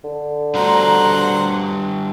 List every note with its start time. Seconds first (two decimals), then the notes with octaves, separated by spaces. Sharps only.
0.04 D3
0.55 G3 D4 F#4 C5 F#5 A#5